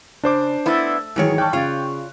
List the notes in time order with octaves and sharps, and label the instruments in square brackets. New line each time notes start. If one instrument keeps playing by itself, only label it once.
[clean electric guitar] C#3 [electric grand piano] D4 C5 D6 [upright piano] D5
[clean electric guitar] A3 A4 E5 [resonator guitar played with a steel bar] B3 E4
[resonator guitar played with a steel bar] G#2 D#3 C#5 [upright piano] E3 F#3 G#4
[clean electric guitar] G3 [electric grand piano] G5 [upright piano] A5 C#6 F#6
[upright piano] C#3 [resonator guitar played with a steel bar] F4 [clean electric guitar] C#5 D5